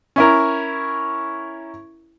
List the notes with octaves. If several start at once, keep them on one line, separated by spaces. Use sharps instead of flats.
C#4 E4 A#4